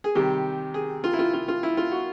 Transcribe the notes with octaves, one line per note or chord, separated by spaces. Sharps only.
G#4
C3 D#3 G3 G4
G#4
F4
E4
F4
F4
F4
E4
F4
F#4